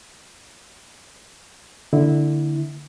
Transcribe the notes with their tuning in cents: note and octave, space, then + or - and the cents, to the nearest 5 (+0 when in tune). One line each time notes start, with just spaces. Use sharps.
D3 +0 A#3 -20 E4 -15